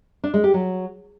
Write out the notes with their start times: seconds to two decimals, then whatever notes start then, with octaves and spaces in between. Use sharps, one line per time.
0.24 D4
0.34 G#3
0.44 G4
0.54 F#3